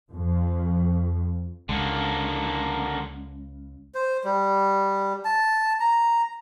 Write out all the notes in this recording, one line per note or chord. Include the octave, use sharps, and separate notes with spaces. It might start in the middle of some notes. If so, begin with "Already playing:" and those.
F2
C#2 D3 A#3
C5
G3
A5
A#5